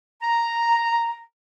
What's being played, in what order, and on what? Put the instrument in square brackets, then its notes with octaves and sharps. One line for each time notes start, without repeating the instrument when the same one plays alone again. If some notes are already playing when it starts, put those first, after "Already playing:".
[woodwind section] A#5